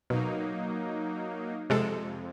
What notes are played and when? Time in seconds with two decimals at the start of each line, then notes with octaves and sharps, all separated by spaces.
0.10 B2 F#3 A#3 D#4
1.70 F2 C3 G#3 A4